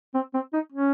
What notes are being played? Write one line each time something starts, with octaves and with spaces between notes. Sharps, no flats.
C4
C4
D#4
C#4